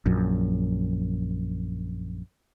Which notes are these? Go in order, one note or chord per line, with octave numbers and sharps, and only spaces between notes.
A#1 F#2